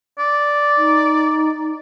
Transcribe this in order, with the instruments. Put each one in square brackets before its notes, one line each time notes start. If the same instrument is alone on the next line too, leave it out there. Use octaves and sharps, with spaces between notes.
[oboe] D5
[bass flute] D#4